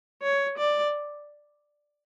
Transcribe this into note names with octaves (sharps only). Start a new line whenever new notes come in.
C#5
D5